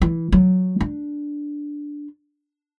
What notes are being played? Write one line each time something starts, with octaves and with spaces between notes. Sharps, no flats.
E3
F#3
D4